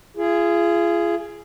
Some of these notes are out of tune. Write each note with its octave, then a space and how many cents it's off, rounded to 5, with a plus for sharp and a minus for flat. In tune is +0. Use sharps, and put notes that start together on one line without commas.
F4 -40 G#4 +0